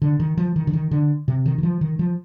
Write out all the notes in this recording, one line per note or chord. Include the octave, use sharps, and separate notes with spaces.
D3
D#3
F3
D#3
D3
D#3
D3
C3
D#3
D#3
F3
D#3
F3